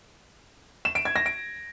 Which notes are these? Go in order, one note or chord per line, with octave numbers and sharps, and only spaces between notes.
E7
D7
G#6
A#6
D7